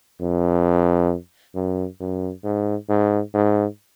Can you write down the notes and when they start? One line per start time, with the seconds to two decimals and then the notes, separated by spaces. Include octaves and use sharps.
0.21 F2
1.55 F#2
2.00 F#2
2.44 G#2
2.89 G#2
3.34 G#2